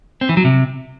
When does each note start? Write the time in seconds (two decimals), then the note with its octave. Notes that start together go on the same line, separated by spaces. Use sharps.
0.21 C4
0.29 E3
0.37 F#3
0.45 C3